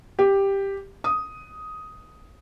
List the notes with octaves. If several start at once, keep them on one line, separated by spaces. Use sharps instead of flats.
G4
D#6